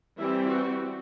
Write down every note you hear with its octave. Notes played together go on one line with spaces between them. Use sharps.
E3 G3 C4 E4
F#4